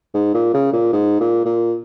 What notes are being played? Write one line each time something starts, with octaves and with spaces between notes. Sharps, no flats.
G#2
A#2
C#3
A#2
G#2
A#2
A#2